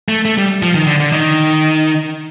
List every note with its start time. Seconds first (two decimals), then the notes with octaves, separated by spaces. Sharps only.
0.08 A3
0.25 A3
0.38 G3
0.63 F3
0.74 D#3
0.87 D3
1.00 D3
1.12 D#3